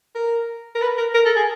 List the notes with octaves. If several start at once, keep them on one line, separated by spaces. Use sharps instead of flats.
A#4
A#4
B4
A#4
A#4
A4
G#4